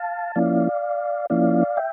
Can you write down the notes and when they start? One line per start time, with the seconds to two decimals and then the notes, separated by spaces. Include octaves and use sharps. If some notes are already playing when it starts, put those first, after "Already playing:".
Already playing: F5 A5
0.36 F3 A#3 C#4 E4 D5 F5
1.30 F3 A#3 C#4 E4 D5 F5
1.77 E5 G5